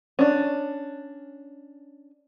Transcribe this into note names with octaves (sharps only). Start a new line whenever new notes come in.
C#4 D4